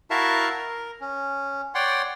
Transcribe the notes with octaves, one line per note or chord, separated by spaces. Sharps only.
E4 F#4 A#4 E5 F5 A5
A#4
C#4
C#5 D5 F#5 G5 C6